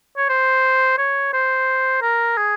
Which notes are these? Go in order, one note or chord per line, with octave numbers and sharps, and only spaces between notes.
C#5
C5
C#5
C5
A#4
G#4